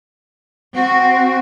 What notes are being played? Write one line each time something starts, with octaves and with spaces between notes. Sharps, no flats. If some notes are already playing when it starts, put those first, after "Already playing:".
C4 F#4